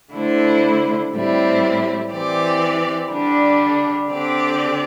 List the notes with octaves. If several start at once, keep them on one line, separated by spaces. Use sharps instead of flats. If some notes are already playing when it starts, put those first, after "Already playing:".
D3 A3 E4 C5
A2 G3 C4 E4
E3 C4 G4 D5
D3 G3 D4
D3 C4 G4 D5